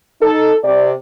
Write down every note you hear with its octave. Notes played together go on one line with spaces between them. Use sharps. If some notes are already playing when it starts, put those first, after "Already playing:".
D#4 A4
C3 D5